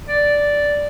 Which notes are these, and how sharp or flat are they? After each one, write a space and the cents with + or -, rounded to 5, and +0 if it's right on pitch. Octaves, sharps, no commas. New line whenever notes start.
D5 -5